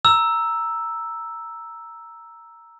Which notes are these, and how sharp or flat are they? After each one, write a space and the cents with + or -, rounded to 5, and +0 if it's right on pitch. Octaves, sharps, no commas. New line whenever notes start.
A#5 +0 E6 +0